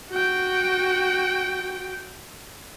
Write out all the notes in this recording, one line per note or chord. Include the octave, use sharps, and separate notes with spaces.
F#4 G5